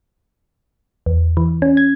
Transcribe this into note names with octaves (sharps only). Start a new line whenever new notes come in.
E2
E3
C#4
G#6